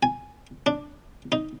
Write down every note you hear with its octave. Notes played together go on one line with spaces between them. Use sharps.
G#5
D4
D#4